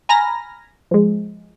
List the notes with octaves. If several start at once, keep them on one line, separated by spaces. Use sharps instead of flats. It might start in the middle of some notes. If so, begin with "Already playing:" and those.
G#5 A#5 B5 F6 A#6
F3 G#3